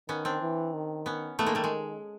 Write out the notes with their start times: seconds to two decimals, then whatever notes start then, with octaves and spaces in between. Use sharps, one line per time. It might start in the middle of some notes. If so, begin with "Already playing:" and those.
0.09 D#3 B3 C#4
0.25 C4 D4
0.42 E3
0.73 D#3
1.06 B3 C#4
1.39 D#3 A3 B3
1.46 G#3 A#3
1.55 G3 A3
1.64 G#3